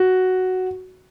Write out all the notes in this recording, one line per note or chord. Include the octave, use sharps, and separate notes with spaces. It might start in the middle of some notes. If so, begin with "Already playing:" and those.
Already playing: F#4